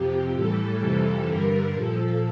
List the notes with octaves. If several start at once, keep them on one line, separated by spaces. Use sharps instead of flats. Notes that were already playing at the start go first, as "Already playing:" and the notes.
Already playing: F2 C3 F3 G4
A2 E3 G3 A4
F2 C3 E3 G3
G2 D3 G3 A#4
A#2 F3 A4